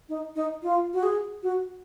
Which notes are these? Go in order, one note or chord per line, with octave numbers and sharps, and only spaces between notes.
D#4
D#4
F4
F#4
G#4
F#4